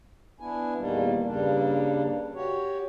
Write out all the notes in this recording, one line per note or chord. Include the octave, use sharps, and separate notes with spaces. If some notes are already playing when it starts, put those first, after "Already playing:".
B3 D4 E4 G#5
E2 A#2 D#3 G3 A#3
G2 C#3 G3 A#3 D4
F#4 G4 C#5